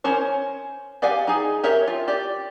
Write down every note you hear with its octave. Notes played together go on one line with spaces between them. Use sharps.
C#4 A#4 C5 C#5
G4 D5 F5 F#5 G#5
D#4 G#4
G4 A#4 C#5 E5
F4
G4 D5